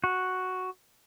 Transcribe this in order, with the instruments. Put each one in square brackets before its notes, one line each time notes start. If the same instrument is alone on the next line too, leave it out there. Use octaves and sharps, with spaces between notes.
[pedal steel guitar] F#4